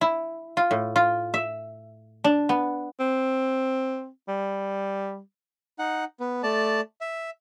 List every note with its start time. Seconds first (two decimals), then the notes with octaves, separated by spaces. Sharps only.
0.01 E4
0.57 F4
0.71 A2
0.96 F4
1.34 E5
2.24 D4
2.49 B3
3.00 C4
4.28 G3
5.79 D#4 F#5
6.20 B3
6.43 A3 D5 A5
7.01 E5